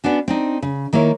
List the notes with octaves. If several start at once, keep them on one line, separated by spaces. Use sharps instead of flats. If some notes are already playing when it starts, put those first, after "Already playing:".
B3 C#4 D4 F#4
C4 D4 D#4
C#3
D#3 A#3 E4 C#5